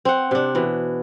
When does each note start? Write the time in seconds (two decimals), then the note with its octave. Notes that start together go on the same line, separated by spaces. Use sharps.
0.05 C4 F#5
0.31 C3 D4
0.55 B2 E3